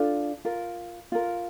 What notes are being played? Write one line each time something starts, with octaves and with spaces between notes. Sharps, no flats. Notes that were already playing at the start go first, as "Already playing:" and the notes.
Already playing: D4 F4 A4
F4 A#4
F4 A#4